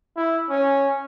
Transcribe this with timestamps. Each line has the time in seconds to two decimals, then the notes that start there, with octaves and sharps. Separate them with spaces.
0.16 E4
0.49 C#4